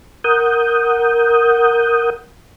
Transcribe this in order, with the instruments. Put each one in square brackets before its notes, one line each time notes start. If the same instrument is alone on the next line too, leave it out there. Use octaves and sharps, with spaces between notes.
[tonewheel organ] A#4 F#5 D#6 G6